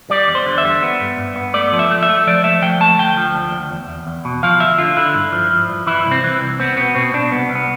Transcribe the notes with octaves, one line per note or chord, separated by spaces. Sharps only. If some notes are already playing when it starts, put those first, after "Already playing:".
G3 D5
E2
C5
D3
E5
G3
B3
G2
G2
B3
A3 D5
F3
E5
A3
E5
A3
F3 D5
A3 E5
F3 G5
A3 A5
D2 G5
F3
D2
D2
E2
E2
E2
B2
F3 F5
D2 E5
D3 F4
D3 E4
G2
F3
F3
G2
E3 E4
C2
C4
E3
C2
B3 C4
B2 B3
B2 C4
B2 D4
C2 B3
C2
B3